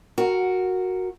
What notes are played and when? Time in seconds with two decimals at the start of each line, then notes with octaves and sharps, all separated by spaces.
0.18 F#4 A#4